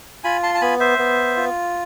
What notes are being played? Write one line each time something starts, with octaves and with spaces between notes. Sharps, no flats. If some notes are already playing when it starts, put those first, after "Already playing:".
F4 G#5 B5
A5 C6
A5
B3 G#5 B5
C5 E5
B3
F4